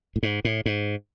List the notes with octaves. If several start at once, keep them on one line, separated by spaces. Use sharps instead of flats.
A2
G#2
A2
G#2